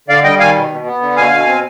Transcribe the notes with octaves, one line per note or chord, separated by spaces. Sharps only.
D3 D5 F5
G3 D#5 G5
D#3 F5 G#5
B2
B2
B3
D3
B2 F5 G#5
B2
C4